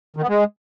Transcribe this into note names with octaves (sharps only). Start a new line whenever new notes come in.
D#3
B3
G#3